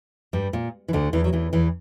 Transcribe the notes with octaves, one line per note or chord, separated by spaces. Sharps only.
G2 G3
A#2
E3
D2 D3
E2 E3
F#3
E2 E3
E2 E3